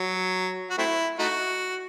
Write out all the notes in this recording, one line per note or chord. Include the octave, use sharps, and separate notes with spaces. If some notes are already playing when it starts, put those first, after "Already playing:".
Already playing: F#3
F#4
A3 C4 E4
A3 D#4 F#4